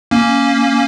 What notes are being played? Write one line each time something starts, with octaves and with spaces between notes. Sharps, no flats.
A#3 C#4